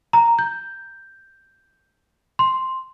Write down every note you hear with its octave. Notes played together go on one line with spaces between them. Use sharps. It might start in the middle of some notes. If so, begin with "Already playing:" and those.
A#5
G6
C6